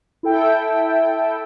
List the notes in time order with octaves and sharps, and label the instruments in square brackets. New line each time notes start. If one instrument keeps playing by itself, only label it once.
[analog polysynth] E4 A4 G5